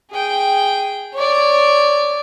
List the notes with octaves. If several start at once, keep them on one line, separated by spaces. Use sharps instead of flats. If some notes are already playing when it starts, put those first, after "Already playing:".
G#4 G5
C#5 D5